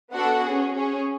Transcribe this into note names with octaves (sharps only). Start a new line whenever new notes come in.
B3 D4 F#4 A4 F#5
G#4
C#4
C#4 G#4